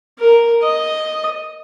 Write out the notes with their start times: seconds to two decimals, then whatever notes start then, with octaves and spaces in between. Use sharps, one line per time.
0.19 A#4
0.63 D#5